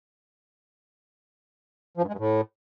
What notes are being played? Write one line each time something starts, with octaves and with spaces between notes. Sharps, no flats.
F3
G2
G#3
G2
A2